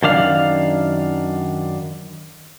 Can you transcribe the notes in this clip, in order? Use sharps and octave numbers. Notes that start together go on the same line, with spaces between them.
F#2 D#3 D4 F5